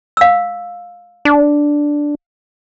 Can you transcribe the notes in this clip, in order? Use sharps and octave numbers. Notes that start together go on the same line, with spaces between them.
F5 E6
D4